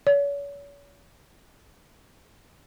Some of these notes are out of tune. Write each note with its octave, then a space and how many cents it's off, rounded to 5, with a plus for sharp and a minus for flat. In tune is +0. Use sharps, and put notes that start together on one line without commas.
C#5 +40